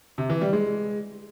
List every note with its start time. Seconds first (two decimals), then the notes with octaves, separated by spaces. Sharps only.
0.18 C3
0.30 E3
0.41 G3
0.53 G#3